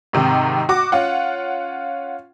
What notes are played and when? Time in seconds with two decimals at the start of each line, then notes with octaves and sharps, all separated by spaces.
0.13 G#2 C3 D#3
0.69 F#4 D6
0.92 C#4 F4 F#5